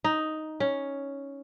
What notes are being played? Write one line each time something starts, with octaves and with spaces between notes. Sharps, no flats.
D#4
C#4